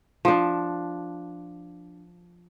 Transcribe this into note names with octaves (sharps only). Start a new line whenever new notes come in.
F3 D4